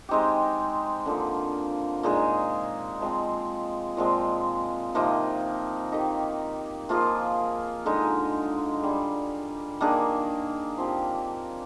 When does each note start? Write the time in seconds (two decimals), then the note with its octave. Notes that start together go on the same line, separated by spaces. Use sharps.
0.09 G#3 C4 D#4 G4
1.06 D3 F3 A#3
2.03 A#2 G#3 D#4 G#4
3.01 F3 G#3 C4
3.97 A#2 F3 G#3 C4
4.95 C3 F3 A#3 D#4
5.92 D#3 A#3 D#4 G4
6.89 F3 A#3 F4 G#4
7.86 D3 G#3 D#4
8.83 G3 D4 G#4
9.81 D#3 A#3 D4 G#4
10.77 F3 C4 G4